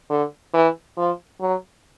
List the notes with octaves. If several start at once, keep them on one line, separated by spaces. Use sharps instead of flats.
D3
E3
F3
F#3